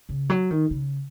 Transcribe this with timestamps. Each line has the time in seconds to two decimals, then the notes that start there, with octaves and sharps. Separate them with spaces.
0.09 C#3
0.29 F#3
0.51 D#3
0.71 C#3